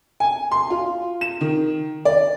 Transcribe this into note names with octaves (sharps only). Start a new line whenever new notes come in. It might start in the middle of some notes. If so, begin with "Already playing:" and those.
G#5
C6
F4
E7
D#3
D5